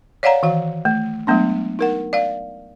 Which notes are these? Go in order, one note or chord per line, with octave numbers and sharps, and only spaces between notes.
C#5 D5 F5 F#5 A#5
D#3 E3 F#4 F5
A3
F#3 G#3 A3 B3 D4
D#4 A#4 F#5
D5 F5